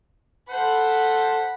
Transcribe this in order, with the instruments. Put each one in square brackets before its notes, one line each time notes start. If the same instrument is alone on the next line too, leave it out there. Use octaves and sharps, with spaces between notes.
[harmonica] A4 C5 A5 [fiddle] F#5 B5